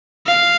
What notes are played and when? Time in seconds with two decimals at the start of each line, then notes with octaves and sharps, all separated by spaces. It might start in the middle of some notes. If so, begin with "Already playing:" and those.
0.27 F5